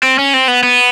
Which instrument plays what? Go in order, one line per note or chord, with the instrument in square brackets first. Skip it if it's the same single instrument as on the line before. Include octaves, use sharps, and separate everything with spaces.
[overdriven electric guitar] C4
C#4
C4
B3
B3